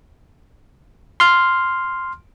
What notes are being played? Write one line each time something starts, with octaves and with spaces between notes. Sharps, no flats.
C6 F6